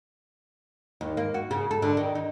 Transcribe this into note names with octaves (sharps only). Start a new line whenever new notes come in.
D#2
A#3
F#4
C#3
A4
D3
D#3
D#4